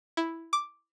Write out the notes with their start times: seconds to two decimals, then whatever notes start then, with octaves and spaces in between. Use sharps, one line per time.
0.17 E4
0.53 D6